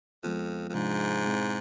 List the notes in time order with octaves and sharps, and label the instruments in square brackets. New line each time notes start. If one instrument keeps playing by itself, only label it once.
[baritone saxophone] F2 [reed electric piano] F3 G#3 B3 F4
[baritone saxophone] F2
[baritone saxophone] G#2 [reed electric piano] C3 F3 G#3 D4 F4
[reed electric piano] B2 G#3 C4 E4